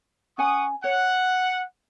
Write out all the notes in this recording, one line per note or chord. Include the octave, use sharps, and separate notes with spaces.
C#4 F#5 G#5 C#6 D#6
C#5 F#5